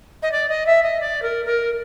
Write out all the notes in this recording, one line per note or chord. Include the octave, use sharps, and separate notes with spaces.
D#5
D5
D#5
E5
D#5
D5
A#4
A#4